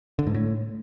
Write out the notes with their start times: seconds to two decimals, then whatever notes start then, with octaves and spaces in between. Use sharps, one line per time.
0.19 D3
0.27 G#2
0.34 A2